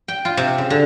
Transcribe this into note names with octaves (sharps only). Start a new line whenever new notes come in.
G5
F4
C3
C#3
D3